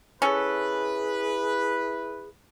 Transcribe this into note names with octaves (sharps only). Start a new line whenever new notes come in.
C#4 E4 G#4 A4 B4